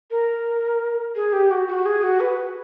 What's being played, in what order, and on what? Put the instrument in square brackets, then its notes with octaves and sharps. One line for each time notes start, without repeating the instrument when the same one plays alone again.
[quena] A#4
G#4
G4
F#4
F#4
G#4
F#4
B4